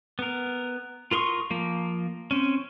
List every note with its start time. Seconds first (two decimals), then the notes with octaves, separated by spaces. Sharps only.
0.19 B3 A#4
1.11 F4 A#4 C6 C#6 D#6
1.50 F3 A#3
2.31 C4 C#4